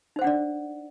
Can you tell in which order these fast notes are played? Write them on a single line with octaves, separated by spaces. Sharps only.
D#4 C5 F#5 D4 D5